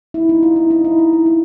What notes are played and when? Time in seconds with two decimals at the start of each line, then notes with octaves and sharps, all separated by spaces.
0.14 E4
0.29 D#4
0.43 F4
0.56 E4
0.71 D#4
0.84 E4
0.98 F4
1.13 E4
1.26 D#4